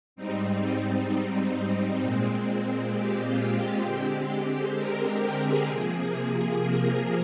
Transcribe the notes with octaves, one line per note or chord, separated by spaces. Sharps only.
G#2 G3 C4 D#4
A#2 G#3 C4
G4
F4
G4
D3 G#3 C4
A#4
G4
G#4
C3 F3 A#3 G#4
A#4